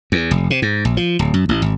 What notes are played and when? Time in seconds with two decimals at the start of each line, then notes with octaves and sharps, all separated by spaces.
0.12 E2
0.31 F1
0.50 C3
0.62 G#2
0.85 A#1
0.97 F3
1.19 D1
1.34 F#2
1.49 A1
1.62 G#1